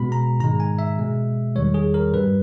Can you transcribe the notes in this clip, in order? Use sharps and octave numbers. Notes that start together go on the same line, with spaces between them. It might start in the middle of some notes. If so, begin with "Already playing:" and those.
Already playing: B2 G#3 B5
A#5
G#2 D#3 G#3 A#5
G#5
E5
B2 G#3
E2 D#3 G3 C#5
G#4
A#4
G2 G3 B4